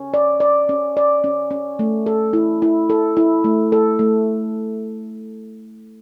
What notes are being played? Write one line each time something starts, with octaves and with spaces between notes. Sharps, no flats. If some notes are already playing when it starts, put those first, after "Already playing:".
Already playing: C#4
D5
D5
C#4
D5
C#4
C#4
A3
A4
E4
E4
A4
E4
A3
A4
A3